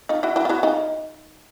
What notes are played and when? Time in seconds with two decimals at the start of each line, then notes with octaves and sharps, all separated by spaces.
0.09 D#4 F4
0.23 E4 F#4
0.36 E4 F#4
0.45 F4
0.49 E4 F#4
0.63 D#4 F4